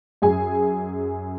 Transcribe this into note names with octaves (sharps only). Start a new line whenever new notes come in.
F#2 G#4 G#5